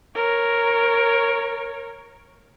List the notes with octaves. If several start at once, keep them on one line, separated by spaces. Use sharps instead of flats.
A#4 C#5